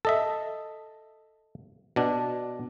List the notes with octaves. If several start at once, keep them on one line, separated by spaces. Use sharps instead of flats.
A4 D#5 E5
B2 D4